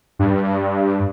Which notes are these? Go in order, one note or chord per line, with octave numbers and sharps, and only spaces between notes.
G2